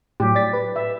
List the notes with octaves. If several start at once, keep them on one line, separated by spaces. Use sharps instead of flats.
A2 F#3 G4
D5 A6 B6
B4
E5